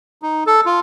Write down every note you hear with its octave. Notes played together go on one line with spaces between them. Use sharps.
D#4
A4
F4